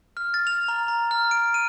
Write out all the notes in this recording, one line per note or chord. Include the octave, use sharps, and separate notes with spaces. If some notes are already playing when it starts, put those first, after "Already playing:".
F6
A6
F7
A#5
A#5
F6
D7
D#7